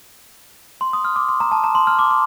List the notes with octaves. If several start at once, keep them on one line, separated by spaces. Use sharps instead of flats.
C6
D#6
F6
D6
C6
A#5
A5
A#5
C6
F6
D6
D6